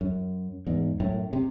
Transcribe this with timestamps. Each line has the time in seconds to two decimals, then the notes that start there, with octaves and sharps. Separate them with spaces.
0.01 F#2
0.67 E2 G#2
1.00 F#2 A2
1.33 C3